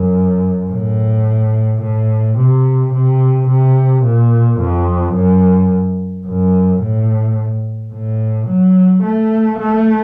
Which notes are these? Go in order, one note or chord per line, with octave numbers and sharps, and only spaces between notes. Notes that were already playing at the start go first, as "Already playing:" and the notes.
Already playing: F#2
A2
A2
C3
C3
C3
A#2
F2
F#2
F#2
A2
A2
F#3
A3
A3